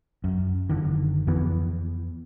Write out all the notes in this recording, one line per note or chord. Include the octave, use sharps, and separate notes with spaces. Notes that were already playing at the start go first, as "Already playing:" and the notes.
F#2
F#1 D3 D#3
F2 E3 B3